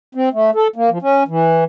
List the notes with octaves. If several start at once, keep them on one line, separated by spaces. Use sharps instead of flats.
C4
A3
A4
A#3
F3
C#4
E3